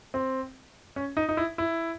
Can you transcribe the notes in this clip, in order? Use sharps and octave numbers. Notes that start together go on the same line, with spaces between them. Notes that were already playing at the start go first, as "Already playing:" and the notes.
C4
C#4
D#4
D#4
E4
E4